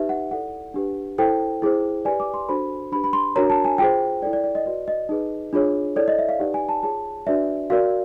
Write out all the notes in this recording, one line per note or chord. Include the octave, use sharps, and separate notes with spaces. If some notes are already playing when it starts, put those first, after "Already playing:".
Already playing: D#4 G4 B4 E5
F#5
E4 A4 D5 F#5
D4 G4 B4
E4 A4 C5 G5
E4 G#4 C5
G4 B4 D5 G#5
D6
C6
D4 F#4 A4 C5 B5
D4 G4 B4 B5
B5
C6
D4 F#4 A#4 C#5 A#5
A5
G#5
F4 G#4 C5 G5
E4 A4 D5 G5
D5
D5
D#5
F#4 B4 D5 D#5
D#5
D#4 G#4 B4
D4 F4 G#4 C#5
E4 A4 C#5 D5
D#5
E5
F5
D#4 G4 B4 D5 F#5
G#5
A5
F4 G#4 C#5 A5
D4 F#4 B4 D5 E5
F#4 A#4 D5 F5